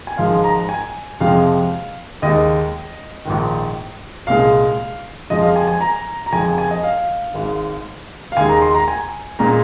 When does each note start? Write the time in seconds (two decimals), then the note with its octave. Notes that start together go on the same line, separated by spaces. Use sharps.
0.07 G#5
0.17 G#1 G#2 F3 G#3 F5
0.44 A#5
0.69 G#5
1.20 F2 C3 F3 G#3 F5
2.22 D#2 D#3 G#3 D#5
3.25 A#1 G#2 D#3
4.27 C2 A#2 G#3 F5
5.30 F2 F3 G#3 D#5
5.42 F5
5.56 G#5
5.68 G#5
5.81 A#5
6.26 A#5
6.32 F2 F3 G#3 G#5
6.45 G#5
6.58 G#5
6.71 D#5
6.83 F5
7.34 G#1 G#2 G#3
8.32 F5
8.37 D#2 D#3 G#3 G#5
8.49 A#5
8.62 C6
8.75 A#5
8.88 G#5
9.39 A#2 G#3 A#5